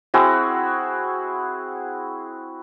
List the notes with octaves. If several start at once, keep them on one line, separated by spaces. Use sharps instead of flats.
C4 E4 F#4 G#4